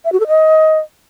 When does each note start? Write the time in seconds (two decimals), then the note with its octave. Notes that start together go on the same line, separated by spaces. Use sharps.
0.05 E5
0.12 F#4
0.20 A4
0.28 D#5